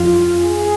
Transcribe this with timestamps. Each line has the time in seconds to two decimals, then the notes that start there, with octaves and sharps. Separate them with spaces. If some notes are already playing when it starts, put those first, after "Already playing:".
Already playing: F2 F4
0.41 G#4